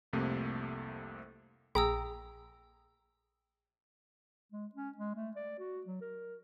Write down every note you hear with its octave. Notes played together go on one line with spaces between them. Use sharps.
C2 F2 C3 A3 A#3
A#1 G#4 G5 A#5 D#6 E6
G#3
C#4
G#3
A3
D5
F#4
F#3
A#4